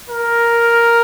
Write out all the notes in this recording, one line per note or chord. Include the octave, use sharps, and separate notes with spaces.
A#4